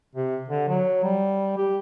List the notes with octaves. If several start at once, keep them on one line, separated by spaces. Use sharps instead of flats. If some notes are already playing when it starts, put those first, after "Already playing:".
C3
D3
F#3
G3
G4